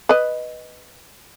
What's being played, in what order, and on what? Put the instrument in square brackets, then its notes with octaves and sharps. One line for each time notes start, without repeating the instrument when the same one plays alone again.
[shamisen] B4 D#5